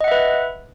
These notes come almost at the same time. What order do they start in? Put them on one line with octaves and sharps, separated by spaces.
D#5 F#5 E5 B4